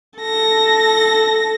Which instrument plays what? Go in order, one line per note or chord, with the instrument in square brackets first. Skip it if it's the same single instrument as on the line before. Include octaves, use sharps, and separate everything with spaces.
[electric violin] A4 A#6